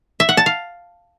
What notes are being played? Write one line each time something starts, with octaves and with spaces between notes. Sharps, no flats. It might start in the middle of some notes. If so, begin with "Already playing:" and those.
E5
F#5
A5
F5